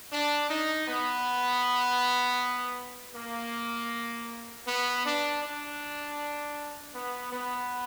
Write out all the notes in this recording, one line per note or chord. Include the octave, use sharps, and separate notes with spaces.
D4
D#4
B3
A#3
B3
D4
D4
B3
B3